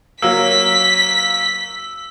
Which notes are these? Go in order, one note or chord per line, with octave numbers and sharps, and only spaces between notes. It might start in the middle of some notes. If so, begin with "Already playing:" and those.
F#3 A#3 E6 B6